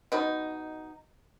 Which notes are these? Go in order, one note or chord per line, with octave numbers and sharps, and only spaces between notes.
B2 D#4